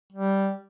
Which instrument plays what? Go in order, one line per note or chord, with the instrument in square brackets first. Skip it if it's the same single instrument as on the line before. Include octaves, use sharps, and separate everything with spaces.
[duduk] G3